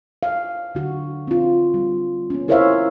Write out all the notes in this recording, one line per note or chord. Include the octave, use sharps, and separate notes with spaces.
F5
D3 F#4
C4 F4
G3
B3 C#4
E4 A#4 C5 C#5 E5 F5